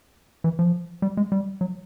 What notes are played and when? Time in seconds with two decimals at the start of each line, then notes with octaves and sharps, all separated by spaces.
0.44 E3
0.59 F3
1.02 G3
1.17 G#3
1.32 G3
1.61 F#3